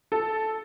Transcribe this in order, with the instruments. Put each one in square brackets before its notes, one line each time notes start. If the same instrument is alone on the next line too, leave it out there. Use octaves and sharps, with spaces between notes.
[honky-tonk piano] A4